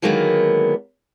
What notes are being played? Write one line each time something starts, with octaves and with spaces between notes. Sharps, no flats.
D3 D#3 F#3 G#3 A#3 B3